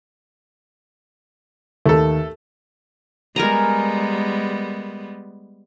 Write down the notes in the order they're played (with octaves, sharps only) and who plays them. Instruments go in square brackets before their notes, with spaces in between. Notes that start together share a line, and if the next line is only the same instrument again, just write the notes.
[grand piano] D#2 [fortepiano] A3 A4
[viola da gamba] G3 G#3 B3 [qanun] A#4 G#5 A#5